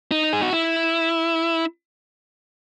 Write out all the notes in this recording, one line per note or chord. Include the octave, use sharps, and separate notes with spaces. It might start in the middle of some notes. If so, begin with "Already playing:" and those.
D#4
G#4
F#4
E4